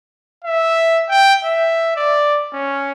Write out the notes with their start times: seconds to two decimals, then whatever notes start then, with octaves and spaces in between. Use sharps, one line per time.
0.44 E5
1.09 G5
1.44 E5
1.96 D5
2.53 C#4